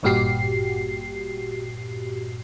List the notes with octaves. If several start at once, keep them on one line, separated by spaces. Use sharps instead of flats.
G#1 G2 A#2 F#4 G4 C7